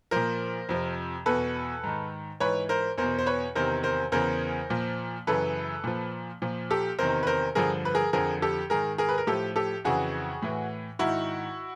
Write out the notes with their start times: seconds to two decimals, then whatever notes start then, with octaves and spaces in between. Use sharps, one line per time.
0.11 A#2 F3 A#4 C5
0.69 F2 C3 F3
1.26 E2 B2 A4 B4
1.83 G#2 D#3
2.40 G#2 E3 B4 C#5
2.69 A#4 C5
2.98 E2 B2 A#4 C5
3.19 C5
3.26 B4 C#5
3.55 E2 C3 D#3 A#4 C5
3.83 A#4 C5
4.12 E2 C#3 E3 A#4 C5
4.70 A#2 F3
5.27 F#2 C#3 E3 A4 B4
5.84 A#2 F3
6.42 A#2 F3
6.70 G4 A4
6.99 E2 C3 D#3 A#4 C5
7.23 B4
7.27 A#4 C5
7.55 G2 D3 F3 G#4 A#4
7.85 B4
7.95 G#4 A#4
8.13 F2 D3 F3 G#4 A#4
8.42 G4 A4
8.70 G#2 D#3 G#4 A#4
8.98 G#4 A#4
9.09 B4
9.18 A#4
9.27 A2 F3 G4 A4
9.56 G4 A4
9.85 F2 C#3 E3 F#4 G#4
10.42 A2 E3
10.99 G#2 D#3 E4 F#4